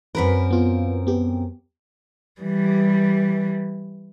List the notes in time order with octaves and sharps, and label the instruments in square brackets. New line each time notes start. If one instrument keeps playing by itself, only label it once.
[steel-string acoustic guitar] F#2 C4 A#4 [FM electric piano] B4 B5
[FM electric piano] B3 F4
B3 G4
[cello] E3 G3